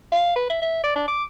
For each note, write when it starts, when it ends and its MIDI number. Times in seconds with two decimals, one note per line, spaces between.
0.12 0.36 77
0.36 0.50 71
0.50 0.59 76
0.62 0.82 76
0.84 0.94 74
0.96 1.03 62
1.08 1.24 86